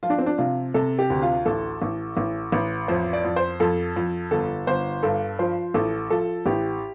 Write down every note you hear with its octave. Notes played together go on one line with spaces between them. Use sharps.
F3 F4
D4
C4
D4
C3 F4
C3 A4
G4
D2
F4
A1 A4
A1
A1
A1
F2 C5
D5
F2
C5
F2 A4
F2
G1 A4
G1 C5
G2 A4
F3 C5
A1 A4
F3 A4
A1 G4